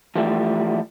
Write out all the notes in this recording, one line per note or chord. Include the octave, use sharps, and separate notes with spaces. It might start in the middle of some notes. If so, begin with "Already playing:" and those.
E3 F3 G3 A3